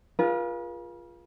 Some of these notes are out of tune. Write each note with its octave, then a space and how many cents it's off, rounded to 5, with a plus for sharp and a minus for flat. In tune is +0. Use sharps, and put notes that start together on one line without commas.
F4 +0 G#4 +0 B4 -45